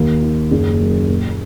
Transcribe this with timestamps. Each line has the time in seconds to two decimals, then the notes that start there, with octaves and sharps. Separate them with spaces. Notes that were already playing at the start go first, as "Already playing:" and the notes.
Already playing: D#2
0.22 D#3
0.51 F#1
0.81 F#2
1.09 A#2